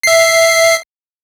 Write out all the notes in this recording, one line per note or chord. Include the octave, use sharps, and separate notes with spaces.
E5 C7